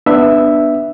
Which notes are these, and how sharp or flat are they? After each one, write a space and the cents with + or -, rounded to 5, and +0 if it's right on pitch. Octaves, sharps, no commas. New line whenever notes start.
B3 +0 D4 +20 E5 +0